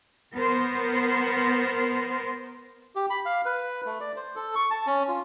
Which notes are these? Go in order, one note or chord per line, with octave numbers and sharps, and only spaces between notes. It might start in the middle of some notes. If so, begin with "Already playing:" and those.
B3 A#4 C5
G4
B5
F5
B4
A3
D5
C5
A4
C#6
A5
C#4
F4